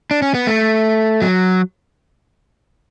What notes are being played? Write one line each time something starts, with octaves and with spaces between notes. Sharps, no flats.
D4
C#4
B3
A3
F#3